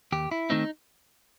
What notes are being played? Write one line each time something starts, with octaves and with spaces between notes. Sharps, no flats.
D#2 G4
E4
D#3 A3 C4 D#4